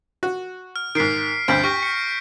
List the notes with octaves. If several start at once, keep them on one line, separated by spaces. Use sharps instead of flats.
F#4
F6
G#2 D#3 B6 C7 D7
D2 G2 C4 G6 B6 D7
G4 C#6 F6 A#6
C#7